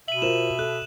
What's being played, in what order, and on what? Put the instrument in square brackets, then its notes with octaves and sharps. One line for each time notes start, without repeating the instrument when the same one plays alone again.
[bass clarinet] B2 [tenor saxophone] E5 [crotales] D#7 F#7
[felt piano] F4 A#4 C5 [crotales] E7
[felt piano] A4 [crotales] F#6